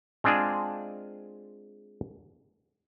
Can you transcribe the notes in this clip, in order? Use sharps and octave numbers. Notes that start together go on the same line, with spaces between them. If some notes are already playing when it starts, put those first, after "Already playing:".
G#3 C4 D4 F4 G#4